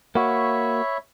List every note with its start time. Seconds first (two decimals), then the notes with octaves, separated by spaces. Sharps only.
0.15 A#3 F#4 C#5 E5 B5